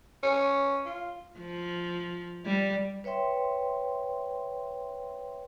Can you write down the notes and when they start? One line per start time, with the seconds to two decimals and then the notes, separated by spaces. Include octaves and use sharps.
0.23 C#4
0.86 F4
1.39 F3
2.46 G3
3.04 B4 C#5 E5 G5 C6